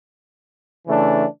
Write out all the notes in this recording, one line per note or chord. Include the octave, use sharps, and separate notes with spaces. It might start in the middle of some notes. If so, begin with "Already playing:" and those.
C#3 E3 A3 D4